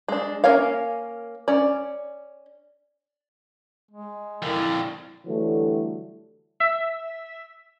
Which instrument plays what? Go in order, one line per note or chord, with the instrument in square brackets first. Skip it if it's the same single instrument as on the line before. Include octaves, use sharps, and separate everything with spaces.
[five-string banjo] G#3 D4
A#3 C#4 A#4 C#5 F5
C#4 D5
[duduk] G#3
[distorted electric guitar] F2 D3 [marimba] E4 A#4
[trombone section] D3 E3 F#3 G3 A3
[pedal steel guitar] E5